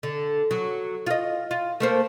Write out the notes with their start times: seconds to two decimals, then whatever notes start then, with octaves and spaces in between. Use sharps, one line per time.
0.03 D3
0.51 F#3
1.06 F4 D#5
1.51 F4
1.80 A3 A#3 C5